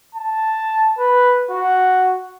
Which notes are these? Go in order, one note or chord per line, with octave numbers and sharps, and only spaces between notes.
A5
B4
F#4